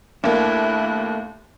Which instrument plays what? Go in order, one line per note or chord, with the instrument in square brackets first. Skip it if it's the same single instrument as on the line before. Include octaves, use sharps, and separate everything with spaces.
[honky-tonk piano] D#2 A#3 [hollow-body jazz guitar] A3 D4 [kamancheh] E4 F#6